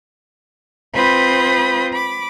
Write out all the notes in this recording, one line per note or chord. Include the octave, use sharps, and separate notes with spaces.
C4 F4 B4 B5 D#6 G6
B5 D6